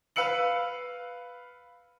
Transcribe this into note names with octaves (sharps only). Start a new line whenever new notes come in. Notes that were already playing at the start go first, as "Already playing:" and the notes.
B4 F5 E6 C#7 F#7